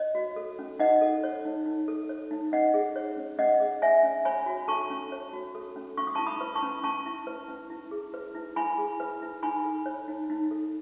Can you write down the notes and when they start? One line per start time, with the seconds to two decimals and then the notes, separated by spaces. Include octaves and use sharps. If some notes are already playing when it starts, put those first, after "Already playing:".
Already playing: C#5 D#5
0.15 F#4
0.36 A4
0.59 C#4
0.79 D#4 D#5 F#5
1.01 A4
1.24 C#5
1.45 D#4
1.66 D#4
1.88 A4
2.09 C#5
2.31 D#4
2.52 C#4 D#5 F#5
2.74 G#4
2.96 C#5
3.17 C#4
3.39 C#4 D#5 F#5
3.60 G#4
3.82 C#5 E5 G#5
4.03 C#4
4.25 C#5 G#5 B5
4.46 F#4
4.68 A4 A5 C#6
4.90 C#4
5.12 C#5
5.33 F#4
5.55 A4
5.76 C#4
5.97 C#4 C#6
6.07 D#6
6.15 E4 A5 C#6
6.26 B5 D#6
6.41 B4
6.55 A5 C#6
6.63 C#4
6.83 C#4 A5 C#6
7.06 E4
7.27 B4
7.48 C#4
7.70 E4
7.91 G#4
8.14 B4
8.34 E4
8.56 E4 G#5 B5
8.78 G#4
9.00 B4
9.22 E4
9.43 D#4 G#5 B5
9.64 A4
9.86 C#5
10.08 D#4
10.30 D#4
10.51 A4